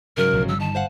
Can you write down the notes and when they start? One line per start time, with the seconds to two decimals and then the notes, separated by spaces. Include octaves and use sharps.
0.17 G#2 C#3 F#3 A#4
0.33 B1 D#3 F3
0.48 G1 G3 E6
0.60 D#3 A5
0.75 C5 F5 F#5